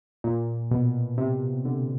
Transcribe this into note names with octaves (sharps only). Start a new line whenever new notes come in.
A#2
B2
C3
D3